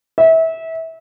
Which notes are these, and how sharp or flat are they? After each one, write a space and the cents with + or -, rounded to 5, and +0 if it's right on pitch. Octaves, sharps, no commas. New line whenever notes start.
E5 -25